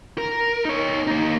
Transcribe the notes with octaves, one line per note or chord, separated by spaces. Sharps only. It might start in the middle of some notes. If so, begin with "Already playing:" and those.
A#4
D#4 C#5
A#3 D#4